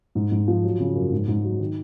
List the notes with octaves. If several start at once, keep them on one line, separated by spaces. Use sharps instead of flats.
G#2
G#2
F3
F#3
C#3
F#2
G#2
G#2
F#3
D#3